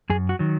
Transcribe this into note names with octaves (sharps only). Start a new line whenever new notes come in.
F#2 G#4
F#4
D#3 F#3